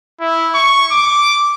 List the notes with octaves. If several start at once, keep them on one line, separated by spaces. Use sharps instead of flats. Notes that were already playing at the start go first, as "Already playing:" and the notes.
E4
C#6
D6